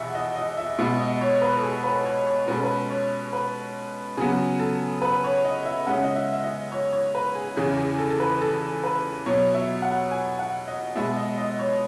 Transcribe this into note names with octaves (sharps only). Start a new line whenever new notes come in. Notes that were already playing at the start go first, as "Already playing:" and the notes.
Already playing: E2 B2 E5 F#5
D#5
D#5
E5
B2 G#3 B3 E5
D#5
C#5
B4
A4
G#4
B4
C#5
C#5
B2 G#3 C#4 B4
A4
B4
C#5
B4
C#3 F#3 B3 G#4
A4
B4
C#5
D#5
E5
C#3 G#3 C#4 F#5
D#5
E5
E5
D#5
C#5
C#5
B4
G#4
E2 C#3 E3 G#4
G#4
A4
A4
B4
A4
B4
B2 F#3 B3 C#5
E5
F#5
G#5
F#5
D#5
B2 G#3 B3 E5
D#5
D#5
C#5